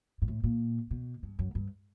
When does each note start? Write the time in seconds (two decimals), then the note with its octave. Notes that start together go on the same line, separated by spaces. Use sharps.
0.22 G#2
0.28 A2
0.44 A#2
0.91 B2
1.23 G2
1.39 F#2
1.55 G2